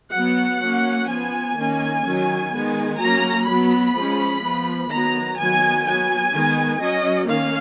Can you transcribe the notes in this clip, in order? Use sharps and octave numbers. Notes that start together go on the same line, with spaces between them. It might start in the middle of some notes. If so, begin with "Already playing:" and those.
F#3 B3 F#5
F#3 A#3 C#4
F3 B3 G#5
D#3 A#3 C#4
D#3 F#3 C#4
D#3 G#3 B3
F#3 A#3 C#4 A#5
F#3 B3 B5
F3 G#3 C#4
F3 B3
D#3 F#3 B3 A#5
D#3 F#3 B3 G#5
F#3 B3 G#5
D#3 G#3 B3
F#3 C#4 D#5
D#3 A#3 C#4 F5